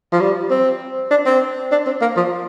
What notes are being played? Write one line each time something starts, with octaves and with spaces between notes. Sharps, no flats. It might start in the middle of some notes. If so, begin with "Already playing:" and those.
F3
G3
C4
D4
C4
D4
C4
A#3
F3